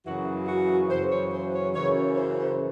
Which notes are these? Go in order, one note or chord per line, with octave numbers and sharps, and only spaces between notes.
F#2 C#3 E3 F#4
F#4
F#2 C#3 E3 C5
C#5
C5
C#5
F#2 C#3 E3 C#5
C#5
C5
C5